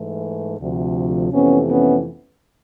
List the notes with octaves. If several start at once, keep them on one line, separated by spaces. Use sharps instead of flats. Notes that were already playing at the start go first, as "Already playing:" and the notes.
Already playing: G#2 E3 A3
D2 C3 F3
F2 C3 E3 A3 B3 C#4
B3 C#4